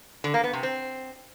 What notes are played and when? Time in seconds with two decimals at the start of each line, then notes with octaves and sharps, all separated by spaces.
0.24 D3
0.34 A#3
0.44 B3
0.53 C3
0.63 C4